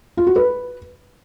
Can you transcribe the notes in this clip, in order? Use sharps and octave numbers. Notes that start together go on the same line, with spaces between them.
F4
F#4
B4